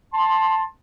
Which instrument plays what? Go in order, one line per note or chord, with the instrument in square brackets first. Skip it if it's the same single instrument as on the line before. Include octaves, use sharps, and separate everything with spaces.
[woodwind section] A5 C6